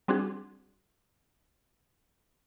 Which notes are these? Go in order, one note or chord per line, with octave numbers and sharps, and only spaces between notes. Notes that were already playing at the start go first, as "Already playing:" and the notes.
G3 C4 D4 F#4 G#4